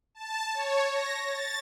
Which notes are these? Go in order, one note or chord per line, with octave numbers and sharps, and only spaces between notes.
A5
C#5
A#6
A6